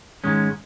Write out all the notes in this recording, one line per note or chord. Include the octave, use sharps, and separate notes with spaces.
G#2 D#3 G#3 C#4